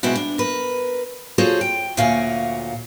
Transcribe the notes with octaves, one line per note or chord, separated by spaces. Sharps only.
B2 G#3 B3 C4 E4 F#4
D4
A#4 B4
F4 F#4 G#4 A4 C5 C#5
G5
D2 A#2 F#4 C#5 F5 G#5